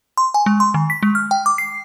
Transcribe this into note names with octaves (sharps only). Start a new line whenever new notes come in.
C6
G#5
G#3
C6
D#3
B6
G#3
F6
G5
D6
C7